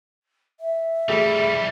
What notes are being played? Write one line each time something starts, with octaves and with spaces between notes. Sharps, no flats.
E5
E3 G3 A3 G4 G#4